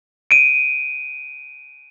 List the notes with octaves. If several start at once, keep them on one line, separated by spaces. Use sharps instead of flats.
D7 D#7